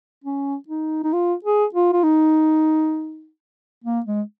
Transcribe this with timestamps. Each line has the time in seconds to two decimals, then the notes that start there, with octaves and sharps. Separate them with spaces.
0.24 C#4
0.68 D#4
1.04 D#4
1.13 F4
1.44 G#4
1.74 F4
1.93 F4
2.03 D#4
3.84 A#3
4.06 G#3